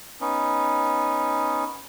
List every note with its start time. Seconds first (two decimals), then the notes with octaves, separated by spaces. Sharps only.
0.21 B3 C#4 D#4